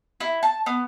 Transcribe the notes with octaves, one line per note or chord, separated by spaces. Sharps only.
E4
A5
B3